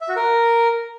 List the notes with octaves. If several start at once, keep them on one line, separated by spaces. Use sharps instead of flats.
E5
F#4
A#4